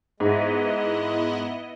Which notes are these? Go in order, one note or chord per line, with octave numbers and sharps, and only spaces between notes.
G#2 G#3 B3 E4 D#5